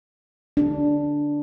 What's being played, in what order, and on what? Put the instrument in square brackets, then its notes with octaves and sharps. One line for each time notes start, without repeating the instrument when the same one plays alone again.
[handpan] D4